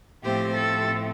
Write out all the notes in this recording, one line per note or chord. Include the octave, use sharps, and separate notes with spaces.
A2 F3 A3 C4 G4 C5
A4